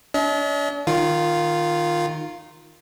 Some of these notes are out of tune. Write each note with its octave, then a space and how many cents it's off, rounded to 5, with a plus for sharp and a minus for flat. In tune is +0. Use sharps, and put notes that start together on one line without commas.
D4 -45 D#5 +45
D#3 -10 F4 +0